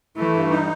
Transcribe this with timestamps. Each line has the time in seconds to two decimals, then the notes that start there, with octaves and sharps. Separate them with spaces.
0.17 E3 A3
0.34 G2
0.50 D#4